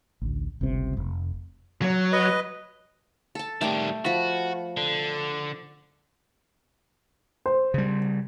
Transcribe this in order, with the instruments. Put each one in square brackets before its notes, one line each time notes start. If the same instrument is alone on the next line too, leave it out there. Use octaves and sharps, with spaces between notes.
[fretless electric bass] A1 D2
G1 C#2 G2 C3
F1
[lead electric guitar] F#3
[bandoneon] B4 D#5
[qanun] A4 A5
[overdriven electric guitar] D#3 G3 [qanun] A3 G5 D6
[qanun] F3 B5 [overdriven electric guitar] F#4
[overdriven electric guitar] D3
[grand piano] C5
[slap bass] C#3 G3